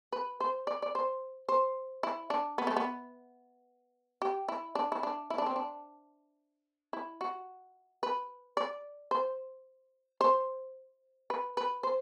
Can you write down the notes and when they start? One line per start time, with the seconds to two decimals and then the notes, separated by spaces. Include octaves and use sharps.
0.12 B4
0.40 C5
0.67 D5
0.82 D5
0.95 C5
1.49 C5
2.03 E4
2.30 D4
2.58 B3
2.67 A3
2.77 B3
4.22 G4
4.48 E4
4.75 D4
4.92 E4
5.03 D4
5.30 E4
5.38 D4
5.46 C4
5.56 D4
6.93 E4
7.21 F#4
8.03 B4
8.57 D5
9.11 C5
10.21 C5
11.30 B4
11.57 B4
11.83 C5